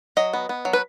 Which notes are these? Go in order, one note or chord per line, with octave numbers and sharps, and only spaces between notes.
F#3 D#5
B3
B3
F#3
B4